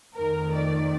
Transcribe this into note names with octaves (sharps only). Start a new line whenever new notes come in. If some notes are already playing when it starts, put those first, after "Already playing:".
F2 D#3 A3 A#4
D5